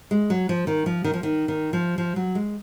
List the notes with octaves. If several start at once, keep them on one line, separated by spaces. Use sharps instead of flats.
G#3
F#3
F3
D#3
F3
D#3
F3
D#3
D#3
F3
F3
F#3
G#3